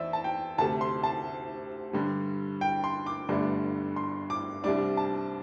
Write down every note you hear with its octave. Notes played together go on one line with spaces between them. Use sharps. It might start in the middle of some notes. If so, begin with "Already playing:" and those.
Already playing: E2 C5 D5 E5
A5
G5
D2 C3 A3 A5
C6
A5
G2 D3 G3
G5
C6
D6
G1 G2 D3 A3 D4
C6
D6
C2 C3 G3 D4 D6
A5